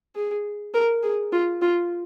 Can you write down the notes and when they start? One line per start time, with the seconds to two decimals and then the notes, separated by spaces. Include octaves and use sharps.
0.16 G#4
0.74 A#4
1.03 G#4
1.32 F4
1.62 F4